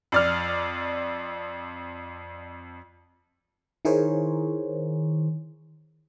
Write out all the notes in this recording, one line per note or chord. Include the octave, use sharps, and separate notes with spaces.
F2 D5 F6
D#3 E4 G#4 A#4 C5 C#5